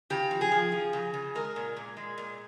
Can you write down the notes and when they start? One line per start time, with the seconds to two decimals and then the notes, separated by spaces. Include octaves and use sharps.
0.10 C#3 G4
0.31 F3
0.41 G#4
0.52 F3
0.72 F3
0.93 C#3
1.14 C#3
1.35 G#3 A#4
1.56 A#2
1.77 A#2
1.97 G#3
2.18 A#2